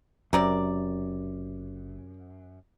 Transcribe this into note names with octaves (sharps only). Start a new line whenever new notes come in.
F#1 F#2 C3 A#4 D5